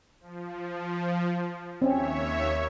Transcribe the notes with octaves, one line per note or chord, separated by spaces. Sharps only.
F3
D#2 C4 C#4 C#5 E5